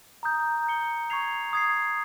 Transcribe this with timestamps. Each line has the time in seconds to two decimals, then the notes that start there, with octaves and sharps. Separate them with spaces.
0.23 A#5 D#6 G6
0.67 G6 C#7 G7
1.10 C#6 G#6 C7 F7
1.53 D#6 G#6 C7